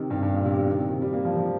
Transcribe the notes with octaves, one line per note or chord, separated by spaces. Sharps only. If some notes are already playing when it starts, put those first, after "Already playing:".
Already playing: C3 D#3
G2
G2
A#2
C3
C3
D#3
C3
C3
G3
A#3
F3
F3